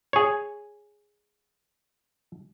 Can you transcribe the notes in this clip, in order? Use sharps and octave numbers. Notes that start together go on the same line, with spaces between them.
G#4 C#5